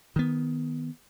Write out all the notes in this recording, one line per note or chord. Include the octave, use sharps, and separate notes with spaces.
D#3 B3